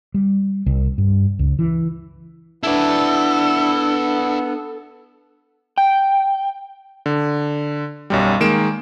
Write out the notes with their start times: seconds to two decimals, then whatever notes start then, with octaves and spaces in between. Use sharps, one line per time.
0.14 G3
0.66 C2
0.98 G2
1.39 C#2
1.59 E3
2.64 B3 D4 E4 A4 D5
5.78 G5
7.06 D3
8.10 B1 F#2 G3
8.40 D#3 G#3 A#3 D7 E7